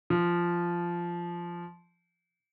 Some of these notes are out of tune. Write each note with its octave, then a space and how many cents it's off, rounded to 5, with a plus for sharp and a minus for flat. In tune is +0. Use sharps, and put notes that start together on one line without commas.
F3 -10